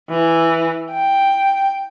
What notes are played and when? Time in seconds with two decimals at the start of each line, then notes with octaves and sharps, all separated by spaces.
0.10 E3
0.93 G5